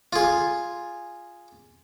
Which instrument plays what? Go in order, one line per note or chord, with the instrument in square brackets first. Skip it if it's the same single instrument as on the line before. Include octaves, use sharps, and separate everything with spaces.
[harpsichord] F4 G#4